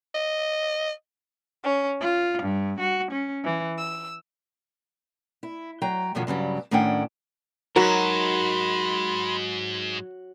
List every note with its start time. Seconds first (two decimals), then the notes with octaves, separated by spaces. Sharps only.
0.15 D#5
1.62 C#4
2.00 F4
2.42 G2
2.79 F#4
3.11 C#4
3.44 E3
3.77 E6
5.43 E4
5.82 F#3 G5 A#5
6.15 F#2 B2 D3 F3 F#3
6.27 G2 C#3 F#3 G3
6.71 A2 D#3 C#4 D4 F#5 G5
7.76 G#2 F#3 D#4 F#4 A#4 B5 C6